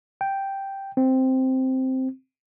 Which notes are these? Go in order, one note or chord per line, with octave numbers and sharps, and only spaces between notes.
G5
C4